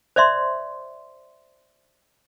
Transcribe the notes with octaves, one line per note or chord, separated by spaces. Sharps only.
C5 D5 E5 C6